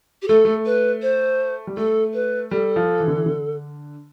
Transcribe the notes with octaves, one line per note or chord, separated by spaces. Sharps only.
G4
A3 A4
A3
B4
C5
G3
A3 A4
B4
G3 A4
F3
E3
D3
E3
D3